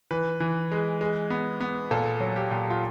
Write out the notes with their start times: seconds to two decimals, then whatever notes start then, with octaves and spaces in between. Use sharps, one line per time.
0.11 E3 B4
0.40 E3
0.72 G#3
1.01 G#3
1.30 B3
1.61 B3
1.91 A#2 A4
2.20 F#3
2.36 G4
2.51 A#2
2.70 F4